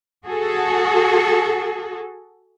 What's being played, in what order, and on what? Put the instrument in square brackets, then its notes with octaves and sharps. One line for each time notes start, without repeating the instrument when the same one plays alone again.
[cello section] F#4 G#4 A4